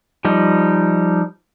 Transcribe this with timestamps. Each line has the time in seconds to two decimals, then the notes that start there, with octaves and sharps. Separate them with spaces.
0.25 F3 G3 D#4